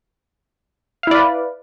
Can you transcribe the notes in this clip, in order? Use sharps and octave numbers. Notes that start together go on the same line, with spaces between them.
E4 B4 D5 F5